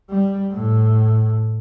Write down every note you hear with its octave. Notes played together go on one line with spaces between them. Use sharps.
G3
A2